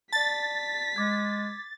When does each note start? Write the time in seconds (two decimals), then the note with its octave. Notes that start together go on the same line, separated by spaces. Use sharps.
0.13 D5 A5 A6 B6
0.96 G#3 D6 G#6